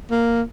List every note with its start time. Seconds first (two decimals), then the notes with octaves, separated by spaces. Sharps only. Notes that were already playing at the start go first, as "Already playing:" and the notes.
0.11 A#3